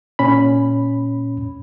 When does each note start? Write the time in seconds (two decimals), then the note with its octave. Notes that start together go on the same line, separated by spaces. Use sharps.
0.19 A#2 C#4 B5